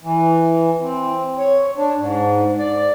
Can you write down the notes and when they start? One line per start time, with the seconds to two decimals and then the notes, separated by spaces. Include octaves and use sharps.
0.02 E3
0.81 C4
1.38 C#5
1.77 D4
1.98 G#2
2.59 D5